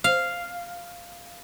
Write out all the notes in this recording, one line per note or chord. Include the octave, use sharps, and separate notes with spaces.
F5